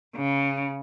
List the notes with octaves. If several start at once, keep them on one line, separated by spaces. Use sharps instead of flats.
C#3